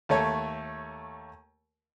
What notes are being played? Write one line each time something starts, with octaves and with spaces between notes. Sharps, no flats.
D#2 A3 A4 C#5